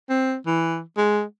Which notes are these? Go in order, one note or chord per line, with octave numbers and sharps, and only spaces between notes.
C4
E3
G#3